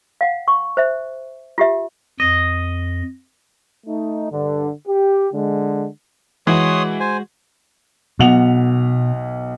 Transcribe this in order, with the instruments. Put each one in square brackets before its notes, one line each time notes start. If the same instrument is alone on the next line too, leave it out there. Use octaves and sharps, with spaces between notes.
[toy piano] F5 F#5
C#6
C5 E5
F4 G4 E5
[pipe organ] F2 [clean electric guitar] D#5
[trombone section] A3 D#4
G2 D3
G4
D3 G#3
[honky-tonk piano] E3 [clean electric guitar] G#3 F#4 [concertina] C#5 C6 D#6
[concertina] C5 G#5
[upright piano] B1 F#5 F7 [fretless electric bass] B2